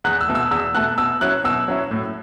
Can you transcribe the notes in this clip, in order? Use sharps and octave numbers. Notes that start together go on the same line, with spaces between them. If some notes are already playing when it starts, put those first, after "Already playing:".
E2 F#6
E6
B2 A3
E6
E2 E6
B2 A3 F#6
B2 E6
F#3 C#4 E4 F#6
B2 E6
F#3 C#4 E4
A2